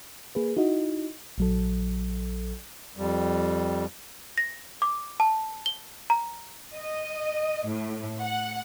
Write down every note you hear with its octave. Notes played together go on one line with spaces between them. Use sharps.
A#3 G#4 B4
D#4 E4 F#4 D#5
A#1 F#3 A4
F2 G3
A#6
D6
A5
G7
A#5
D#5
A2
F#5